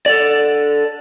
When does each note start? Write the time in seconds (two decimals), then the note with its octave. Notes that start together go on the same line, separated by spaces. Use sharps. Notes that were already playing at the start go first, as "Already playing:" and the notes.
0.06 A4 D5